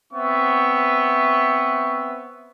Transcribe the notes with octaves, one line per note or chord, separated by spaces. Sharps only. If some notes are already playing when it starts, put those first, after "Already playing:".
B3 C4 E5 C#6